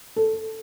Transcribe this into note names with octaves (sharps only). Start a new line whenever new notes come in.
A4